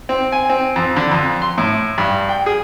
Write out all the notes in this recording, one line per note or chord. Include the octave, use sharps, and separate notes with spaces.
C4
G#5
C4
F2
D3
F2
C6
A2
G2
G5
G#4